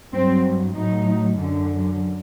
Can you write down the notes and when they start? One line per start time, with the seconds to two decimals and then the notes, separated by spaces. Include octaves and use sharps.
0.12 G2 F#3 C4
0.75 A2 F#3 D#4
1.37 F#2 D3 F#3